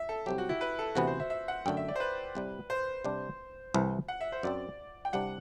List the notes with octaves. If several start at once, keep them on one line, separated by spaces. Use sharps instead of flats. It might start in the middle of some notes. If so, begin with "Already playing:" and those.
Already playing: E5
A4
C2 C3 F#3 G4
F#4
E4
B4
A4
D2 C3 E3 B3 F#4
C5
E5
E5
F#5
F#2 D3 A3 G5
E5
D5
C5
B4
C2 C3 G3
C5
C3 G3 D4
C2 C3 E3
F#5
E5
C5
F#2 F#3 C4 D5
G5
C2 C3 G3 D4 F#5